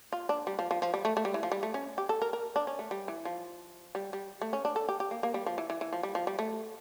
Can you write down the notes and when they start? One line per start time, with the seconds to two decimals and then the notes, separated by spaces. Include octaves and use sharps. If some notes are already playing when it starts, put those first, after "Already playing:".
0.13 F4
0.29 D4
0.47 G3
0.59 F3
0.71 F3
0.82 F3
0.94 G3
1.05 A3
1.17 A3
1.25 G3
1.34 E3
1.43 F3
1.52 G3
1.63 A3
1.74 C#4
1.98 G4
2.09 A4
2.22 A#4
2.33 A#4
2.56 D4
2.67 C#4
2.79 A3
2.91 G3
3.08 E3
3.25 F3
3.95 G3
4.13 G3
4.42 A3
4.53 C#4
4.65 D4
4.76 A4
4.89 G4
5.00 G4
5.11 A#3
5.23 A#3
5.34 G3
5.46 F3
5.58 E3
5.70 E3
5.81 E3
5.93 F3
6.03 G3
6.15 F3
6.27 G3
6.39 A3